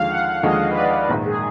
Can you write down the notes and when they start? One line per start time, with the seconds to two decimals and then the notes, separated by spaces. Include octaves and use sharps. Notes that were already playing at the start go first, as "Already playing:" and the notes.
Already playing: D#2 D3 F3 G#3 F5
0.09 F#5
0.26 F#5
0.43 D#2 D3 F3 G#3 D#5
0.71 B4
0.76 D5
1.09 A#1 G#2 D#3 G#3 B4
1.26 G#4